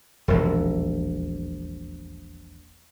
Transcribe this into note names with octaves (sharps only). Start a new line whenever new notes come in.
E1 A#1 D#2